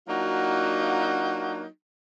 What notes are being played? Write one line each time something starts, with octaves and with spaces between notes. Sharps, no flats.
F#3 A#3 D4 D#4 F4 F#4